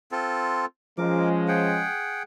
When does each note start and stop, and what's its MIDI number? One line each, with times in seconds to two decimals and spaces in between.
0.12 0.66 60
0.12 0.66 65
0.12 0.66 69
0.98 1.87 53
0.98 1.87 56
0.98 1.87 61
0.98 1.29 70
0.98 1.29 86
1.48 2.23 68
1.48 2.23 78
1.48 2.23 79